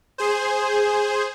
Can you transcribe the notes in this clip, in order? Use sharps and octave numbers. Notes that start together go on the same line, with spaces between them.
G#4 C5